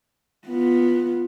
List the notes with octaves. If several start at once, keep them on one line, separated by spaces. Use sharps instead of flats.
B3 F4